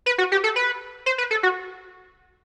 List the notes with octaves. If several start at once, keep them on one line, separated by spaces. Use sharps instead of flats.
B4
F#4
G4
A4
B4
C5
B4
A4
F#4